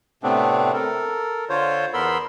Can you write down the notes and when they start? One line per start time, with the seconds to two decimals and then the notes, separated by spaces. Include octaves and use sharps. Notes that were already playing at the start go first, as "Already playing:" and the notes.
0.23 A2 C3 A3 B3 C4 D4
0.74 A4 A#4
1.49 D3 F4 C5 C#5
1.94 E2 B3 A#4 B5 C6 E6